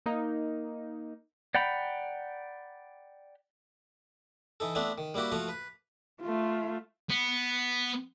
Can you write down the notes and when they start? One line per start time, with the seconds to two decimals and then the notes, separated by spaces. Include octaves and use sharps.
0.06 A#3 D#4
1.55 D5 F#5 G5 A#5 B5
4.60 E3 D#4 A4
4.75 A3 B3 C4 D4 E4
4.98 D#3
5.14 G3 A#3 E4 F#4 G4
5.32 F3 A3 F#4 F5 C#6
5.48 B4
6.22 A3 F4
7.10 B3